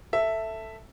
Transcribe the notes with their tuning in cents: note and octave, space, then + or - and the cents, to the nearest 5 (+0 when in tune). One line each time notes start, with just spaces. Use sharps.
A4 +10 E5 +0